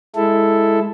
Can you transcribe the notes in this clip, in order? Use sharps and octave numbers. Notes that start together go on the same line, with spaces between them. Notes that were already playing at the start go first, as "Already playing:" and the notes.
G#3 E4 A4